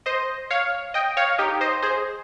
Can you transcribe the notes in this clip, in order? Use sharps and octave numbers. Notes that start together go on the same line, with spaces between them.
C5 D#5
C#5 F5
D#5 G5
C#5 F5
D#4 G4
C5 D#5
G#4 C5